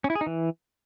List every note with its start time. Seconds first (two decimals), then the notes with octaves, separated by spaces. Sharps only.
0.04 C#4
0.10 E4
0.15 G#4
0.21 D#4
0.27 E3